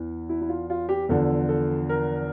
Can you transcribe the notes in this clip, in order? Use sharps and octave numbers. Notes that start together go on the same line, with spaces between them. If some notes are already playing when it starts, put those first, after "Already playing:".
Already playing: E2 E3
E4
E4
F4
F4
G4
E2 D3 F3 A4
A4
A#4